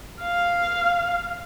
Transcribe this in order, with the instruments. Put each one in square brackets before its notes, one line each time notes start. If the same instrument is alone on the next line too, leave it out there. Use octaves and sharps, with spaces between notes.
[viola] F5